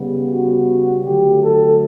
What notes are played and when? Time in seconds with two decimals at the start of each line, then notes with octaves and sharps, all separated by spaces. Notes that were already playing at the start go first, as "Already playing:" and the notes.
Already playing: C#3 G3 B3
0.29 F#4
1.05 D3 F#3 A3 G4
1.43 A4